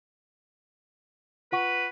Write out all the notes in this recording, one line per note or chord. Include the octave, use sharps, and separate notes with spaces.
F4 B4 F#5 C#6